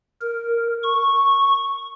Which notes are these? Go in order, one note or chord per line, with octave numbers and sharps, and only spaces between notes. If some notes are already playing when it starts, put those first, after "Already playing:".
A#4
C#6